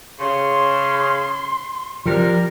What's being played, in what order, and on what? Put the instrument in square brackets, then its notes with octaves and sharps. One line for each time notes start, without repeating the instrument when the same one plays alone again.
[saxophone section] C#3 [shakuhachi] C6
[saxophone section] C3 G3 A#4 [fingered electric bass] F3